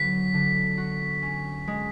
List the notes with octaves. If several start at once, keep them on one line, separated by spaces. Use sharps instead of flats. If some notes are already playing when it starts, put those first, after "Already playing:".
Already playing: D3 F#3 B3 B6
D3
F#4
C#4
G#3